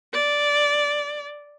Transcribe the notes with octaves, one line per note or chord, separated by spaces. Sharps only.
D5